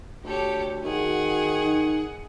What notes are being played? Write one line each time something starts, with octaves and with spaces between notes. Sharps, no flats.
D2 G4 A4 C#5
D#3 F#4 G#4 F#5
D#4